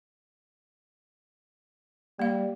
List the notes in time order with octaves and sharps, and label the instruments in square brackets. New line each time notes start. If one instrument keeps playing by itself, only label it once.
[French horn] G3 [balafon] A#3 F5